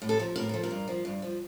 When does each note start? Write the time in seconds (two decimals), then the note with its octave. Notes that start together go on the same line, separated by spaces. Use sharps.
0.02 A2
0.09 A4
0.19 F3 A#4
0.36 A2 A#4
0.49 F3 A4
0.63 A#4
0.71 G2
0.88 F3
1.05 G2
1.22 F3